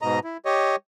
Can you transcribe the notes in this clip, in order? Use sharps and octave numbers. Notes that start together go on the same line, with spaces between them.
G#2 B2 D#5 A#5
E4
G4 C#5 D#5